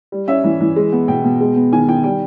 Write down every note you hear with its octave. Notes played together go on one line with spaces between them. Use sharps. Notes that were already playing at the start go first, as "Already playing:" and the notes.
G3
C#4 E5
E3
E3
G#3
B3
B2 G5
B2
G#3
B3
D#3 G#5
D#3 G5
G3 G5